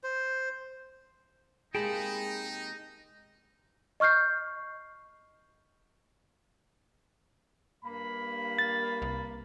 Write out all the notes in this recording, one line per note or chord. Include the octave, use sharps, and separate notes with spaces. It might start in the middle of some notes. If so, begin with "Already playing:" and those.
C5
C3 G#3 A#3 D#4 G#4 G5 A5 B5
D#5 C#6 F6 G6 C7
G2 A#3 B5
A6
C2